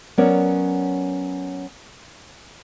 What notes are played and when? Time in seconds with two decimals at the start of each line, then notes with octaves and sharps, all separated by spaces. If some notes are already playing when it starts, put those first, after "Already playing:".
0.18 F#3 B3 C#4 A#4 C#5 D5